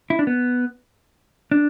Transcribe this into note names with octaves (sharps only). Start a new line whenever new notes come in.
E4
D4
B3
D4